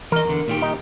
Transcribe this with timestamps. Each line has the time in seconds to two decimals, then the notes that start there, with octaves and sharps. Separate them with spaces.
0.12 E3 A#4 D#5
0.25 E2 D3
0.48 A#2 D#3 G4
0.62 D#4